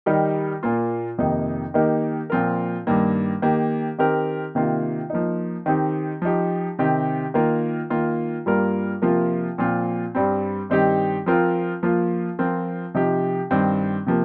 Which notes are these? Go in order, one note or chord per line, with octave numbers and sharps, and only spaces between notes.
D#3 G3 D#4 G4 A#4
A#2 A#3 F4
F2 C3 D#3 A#3 D#4
D#3 A#3 D#4 G4 A#4
A#2 F3 C4 F4 A#4
G2 D#3 A#3
D#3 A#3 G4
D#3 C4 G4 A#4
C3 D#3 A#3 F4
F3 A#3 D#4
D#3 C4 D#4 G4
F3 D#4 G4
C3 D#3 C4 G4
D#3 A#3 F4 A#4
D#3 A#3 F4
G2 G3 A#3 F4 A#4
C3 F3 A#3 F4 A#4
A#2 F3 C4 F4
G2 G3 C4
G2 D#3 C4 D#4 G4
F3 C4 F4 A#4
F3 A#3 F4
F3 C4 F4 A#4
C3 F3 D#4 G4
G2 D#3 C4
C3 F3 A#3